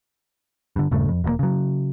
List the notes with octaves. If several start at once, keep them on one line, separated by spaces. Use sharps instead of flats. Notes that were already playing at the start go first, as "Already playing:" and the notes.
G2 D3
D#1 G2 C#3 A3
F2
E1 C3 A#3
C#3 F#3